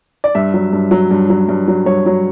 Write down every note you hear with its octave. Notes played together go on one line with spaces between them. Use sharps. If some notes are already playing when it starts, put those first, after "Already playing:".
D5
G2 E5
F#3
G2
F#3
G2
F#3
G2
F#3
G2 C#5
F#3